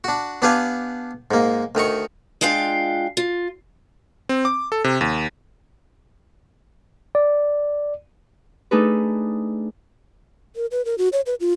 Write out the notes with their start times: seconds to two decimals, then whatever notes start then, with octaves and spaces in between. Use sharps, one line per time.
0.04 D4 F#4
0.42 B3 D4 G4 B4 F5 G#5
1.31 G#2 A#3
1.75 D2 D#3 A#5 C#6
2.41 G#3 D4 F4 F5 G5
3.17 F4
4.29 C4
4.45 D6
4.72 A4
4.84 C3
5.01 D#2
7.15 D5
8.71 A3 D4 D#4 G#4 A4 B4
10.56 A#4
10.71 B4
10.85 A#4
10.98 F#4
11.13 C#5
11.26 B4
11.40 F4